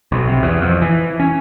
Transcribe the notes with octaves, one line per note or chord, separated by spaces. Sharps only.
B1
C3
E2
F2
E3
C#4